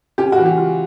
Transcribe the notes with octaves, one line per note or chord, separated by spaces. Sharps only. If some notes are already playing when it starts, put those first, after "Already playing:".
C#4 G4
F#4
E3
G4
F4